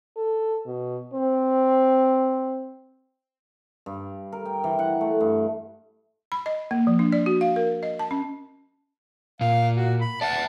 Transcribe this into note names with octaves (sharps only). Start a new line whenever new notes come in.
A4
B2
C4
G2
A#4
G5
E3
F#5
A3
G2
B5
D#5
A#3
F3
D4
D5
F#4
F5
A#4
D#5
A5
C#4
A#2 F5
F#4
B5
D5 E5 F#5 A5